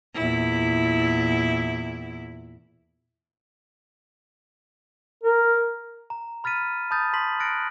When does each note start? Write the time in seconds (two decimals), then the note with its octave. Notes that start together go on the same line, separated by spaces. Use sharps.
0.14 E2 A#2 E4
5.24 A#4
6.10 A#5
6.44 B5 F6 A6 B6 D#7
6.91 A5 B5 D#6 G6 A6
7.13 A5 C6 B6 F#7
7.40 F6 F#6 A6 A#6 C#7 D7